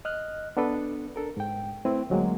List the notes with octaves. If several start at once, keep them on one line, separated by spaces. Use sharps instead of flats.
D#5 F6 F#6
B3 D4 A4 B4
D4 A4 A#4
G#2 G5
A3 C4 E4 B4
D2 F#3 G#3 A#3